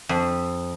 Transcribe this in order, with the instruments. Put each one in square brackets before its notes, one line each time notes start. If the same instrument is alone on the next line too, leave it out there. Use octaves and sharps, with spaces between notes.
[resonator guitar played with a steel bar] F2